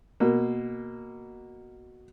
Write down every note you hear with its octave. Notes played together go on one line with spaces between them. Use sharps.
B2 A#3